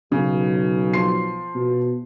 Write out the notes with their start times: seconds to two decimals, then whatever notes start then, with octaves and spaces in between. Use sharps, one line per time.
0.12 B1 C#3
0.93 F3 C6 C7
1.55 B2